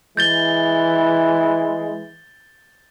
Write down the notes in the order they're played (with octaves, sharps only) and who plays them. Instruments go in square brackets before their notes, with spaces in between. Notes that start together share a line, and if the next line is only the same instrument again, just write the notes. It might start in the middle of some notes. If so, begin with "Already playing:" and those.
[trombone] E3 [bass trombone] G#3 [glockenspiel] G6 A6 G7